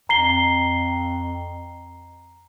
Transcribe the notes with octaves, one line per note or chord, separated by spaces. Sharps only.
F2 A#5 C7 G7